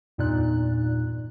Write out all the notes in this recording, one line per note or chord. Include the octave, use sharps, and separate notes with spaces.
E2 G2 A#2 D#4 D5 F#6